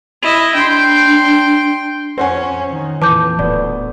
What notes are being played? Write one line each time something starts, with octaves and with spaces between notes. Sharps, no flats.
E4 D#5
D4 G5 C6
F2 C#4 C5 F#5 G#5
D#3
F2 A#2 E3 A5 D6 G6
D1 D2 B3 D5